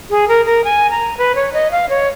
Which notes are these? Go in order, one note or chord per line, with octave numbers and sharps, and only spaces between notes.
G#4
A#4
A#4
G#5
A#5
B4
C#5
D#5
F5
C#5